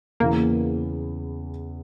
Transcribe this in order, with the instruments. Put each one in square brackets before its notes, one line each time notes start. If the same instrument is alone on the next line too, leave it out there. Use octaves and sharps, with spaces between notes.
[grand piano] E2 C#3 E3 [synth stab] A#3